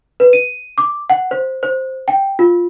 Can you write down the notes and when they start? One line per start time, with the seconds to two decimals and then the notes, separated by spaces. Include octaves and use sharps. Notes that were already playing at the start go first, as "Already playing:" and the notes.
0.20 B4
0.33 D#7
0.78 D6
1.10 F#5
1.31 C5
1.63 C5
2.08 G5
2.39 F4